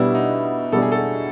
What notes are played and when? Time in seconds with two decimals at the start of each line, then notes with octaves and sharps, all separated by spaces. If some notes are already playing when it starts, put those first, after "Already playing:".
Already playing: B2 G3 B3 D4 E4 G4
0.15 D#4
0.72 B2 G3 B3 D4 G4 A4
0.82 G#4
0.92 A4